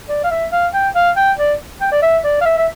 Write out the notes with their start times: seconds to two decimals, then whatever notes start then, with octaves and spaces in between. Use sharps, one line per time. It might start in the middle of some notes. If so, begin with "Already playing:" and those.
0.09 D5
0.24 F5
0.30 E5
0.52 F5
0.73 G5
0.95 F5
1.16 G5
1.38 D5
1.81 G5
1.92 D5
2.02 E5
2.24 D5
2.41 F5
2.45 E5
2.58 E5